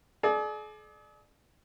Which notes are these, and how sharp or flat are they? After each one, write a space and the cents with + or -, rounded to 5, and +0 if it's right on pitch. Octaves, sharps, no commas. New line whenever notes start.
G#4 +45 D5 +25